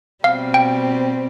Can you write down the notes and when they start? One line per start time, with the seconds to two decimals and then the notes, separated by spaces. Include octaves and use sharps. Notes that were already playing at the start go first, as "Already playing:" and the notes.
0.24 B2 G3 C4 F5
0.54 G5